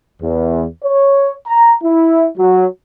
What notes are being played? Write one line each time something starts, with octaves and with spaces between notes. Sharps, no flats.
E2
C#5
A#5
E4
F#3